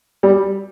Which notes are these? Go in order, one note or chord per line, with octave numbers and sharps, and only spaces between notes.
G3